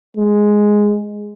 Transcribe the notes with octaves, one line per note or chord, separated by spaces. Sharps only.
G#3